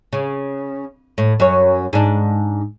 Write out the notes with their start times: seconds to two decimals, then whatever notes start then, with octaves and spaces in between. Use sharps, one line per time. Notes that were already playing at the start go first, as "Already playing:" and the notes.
0.13 C#3
1.18 A2
1.40 F#2 C#5
1.93 G#2 D4